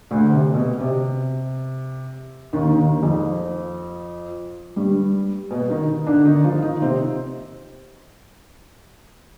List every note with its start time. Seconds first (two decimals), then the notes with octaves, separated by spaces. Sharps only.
0.11 D2 D3
0.30 C3
0.54 B2
0.80 C3
2.53 D#2 D#3
2.78 D#2 D#3
3.03 F2 F3
4.76 G2 G3
5.51 B2 B3
5.70 D#3 D#4
6.07 D3 D4
6.25 D#3 D#4
6.44 F3 F4
6.63 D#3 D#4
6.82 C3 C4